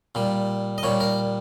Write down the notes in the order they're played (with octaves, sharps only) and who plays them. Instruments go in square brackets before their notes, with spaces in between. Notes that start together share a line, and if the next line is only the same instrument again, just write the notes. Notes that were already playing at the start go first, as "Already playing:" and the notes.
[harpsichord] A#2 G3
D#5
A#2 G3 C#5
A#4